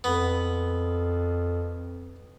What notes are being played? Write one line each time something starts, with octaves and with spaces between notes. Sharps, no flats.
F2 B3